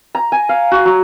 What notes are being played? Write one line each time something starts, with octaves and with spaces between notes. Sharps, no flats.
A#5
G#5
F5
F#4
F#3